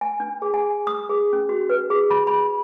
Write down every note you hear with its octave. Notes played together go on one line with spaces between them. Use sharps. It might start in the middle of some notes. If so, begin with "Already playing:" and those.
G#5
D4
G#4
G#5
D#6
G#4
C#4
F#4
B4
G#4
B5
B5